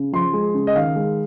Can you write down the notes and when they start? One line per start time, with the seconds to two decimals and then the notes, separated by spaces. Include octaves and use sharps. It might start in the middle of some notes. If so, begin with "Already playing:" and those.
Already playing: C#3
0.13 F3 C6
0.33 G#3
0.54 C#3
0.67 D#5
0.75 D#3 F5
0.96 G#3